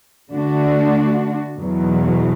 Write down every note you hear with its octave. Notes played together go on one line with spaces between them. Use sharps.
D3 A3 D4 F#4
E2 B2 F#3